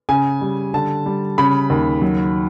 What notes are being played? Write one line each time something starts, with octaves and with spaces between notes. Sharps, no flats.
C#3 G#5
G3
D3 A5
G3
C#3 B5
D#2
F#3